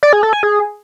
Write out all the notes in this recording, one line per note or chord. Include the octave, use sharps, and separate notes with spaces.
D5
G#4
A4
G#5
G#4